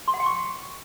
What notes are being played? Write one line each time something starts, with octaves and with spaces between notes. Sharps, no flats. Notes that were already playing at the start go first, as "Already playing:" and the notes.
C6
F#5
G5
C#6